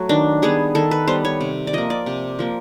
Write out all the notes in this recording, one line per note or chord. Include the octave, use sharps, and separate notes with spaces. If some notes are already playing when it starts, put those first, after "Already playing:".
Already playing: F#3 A3
D#3 D4
G3 B3 G#4
D#3 A4
B4
G3 B3 C5
C#5
C3
D5
F3 A#3 D#5
D5
C3
F3 A#3